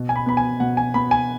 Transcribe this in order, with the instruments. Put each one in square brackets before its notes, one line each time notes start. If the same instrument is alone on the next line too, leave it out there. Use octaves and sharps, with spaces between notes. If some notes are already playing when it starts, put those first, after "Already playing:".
Already playing: [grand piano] B2
G#5
B5
B3 B5
G#5
B2 F#5
G#5
B3 B5
G#5